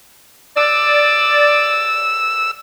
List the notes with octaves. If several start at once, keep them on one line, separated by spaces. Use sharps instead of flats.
D5 E6